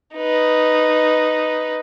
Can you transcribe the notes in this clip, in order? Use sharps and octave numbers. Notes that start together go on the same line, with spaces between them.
D#4 B4